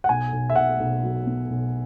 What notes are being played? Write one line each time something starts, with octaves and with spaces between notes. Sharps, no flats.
F#5
B1 G#5
B1
E5
B1 F#5
B1
F#3
B2
B1